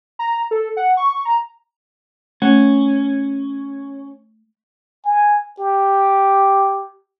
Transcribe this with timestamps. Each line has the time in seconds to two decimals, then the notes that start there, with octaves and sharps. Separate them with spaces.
0.19 A#5
0.51 A4
0.77 F#5
0.97 C#6
1.25 A#5
2.42 A3 C#4
5.05 G#5
5.59 G4